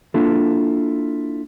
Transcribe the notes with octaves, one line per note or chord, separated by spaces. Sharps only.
A#3 D4 E4 F4 A4